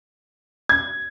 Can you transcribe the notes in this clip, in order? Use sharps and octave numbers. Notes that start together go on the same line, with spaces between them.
G#6